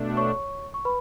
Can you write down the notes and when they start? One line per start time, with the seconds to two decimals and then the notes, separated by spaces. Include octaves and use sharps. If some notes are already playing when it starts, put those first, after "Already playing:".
Already playing: B2 A3 D4
0.17 C#5 C#6
0.74 C#6
0.85 B4 B5